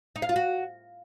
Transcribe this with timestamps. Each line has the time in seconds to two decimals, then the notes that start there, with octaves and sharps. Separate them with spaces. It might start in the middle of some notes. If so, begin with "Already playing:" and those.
0.16 D#4
0.22 F5
0.29 F4
0.36 F#4